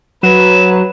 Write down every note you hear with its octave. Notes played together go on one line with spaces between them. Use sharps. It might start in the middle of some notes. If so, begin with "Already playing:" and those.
F#3 B4 E7